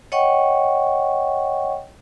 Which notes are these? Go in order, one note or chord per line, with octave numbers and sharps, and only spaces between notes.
C#5 D#5 F#5 G5 C#6